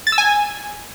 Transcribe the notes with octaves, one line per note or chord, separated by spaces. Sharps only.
A6
E6
G#5